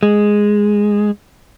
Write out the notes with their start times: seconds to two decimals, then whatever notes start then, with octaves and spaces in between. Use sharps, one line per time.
0.03 G#3